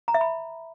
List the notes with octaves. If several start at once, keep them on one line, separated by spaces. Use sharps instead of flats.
A#5
E5
B5